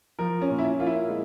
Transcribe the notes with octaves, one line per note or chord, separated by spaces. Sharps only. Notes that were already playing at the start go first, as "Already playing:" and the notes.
F3 A#4
C#4
A#2
E4
C#4
A#3 F4
E4
G#3